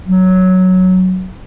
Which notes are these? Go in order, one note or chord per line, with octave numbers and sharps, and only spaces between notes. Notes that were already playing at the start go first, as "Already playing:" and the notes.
F#3